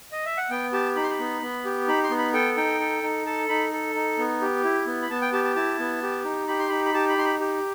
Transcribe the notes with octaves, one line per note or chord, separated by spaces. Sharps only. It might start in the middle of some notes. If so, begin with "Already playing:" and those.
D#5
E5
F#5
B3 G5
G4 A5
D#4 B5
C6
B5
B3
B3
G4
D#4 B5
C6
B3
B5
A4 G5
D#4 G5
A4
D#4
A4 A5
D#4 B5
A4
D#4
B3
G4
E4
B3
B5
B3 A5
G5
G4 A5
A5
E4 A5
B3
G4
D#4
G4 B5
C6
D#4 B5
B5
G4 A5
B5
D#4 C6
B5
G4